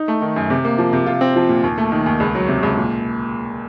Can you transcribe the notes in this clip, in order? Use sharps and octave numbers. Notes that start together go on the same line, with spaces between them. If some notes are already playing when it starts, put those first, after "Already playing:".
Already playing: D#4
A3
D#3
F#2
C3
A#3
F3
C3
F4
C4
F3
A#2
D#2
A3
D#3
D#2
C#2
F#3
C3
C#2
A#2